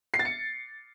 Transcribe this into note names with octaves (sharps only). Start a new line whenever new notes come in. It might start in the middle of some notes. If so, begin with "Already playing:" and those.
C7
A6
C#7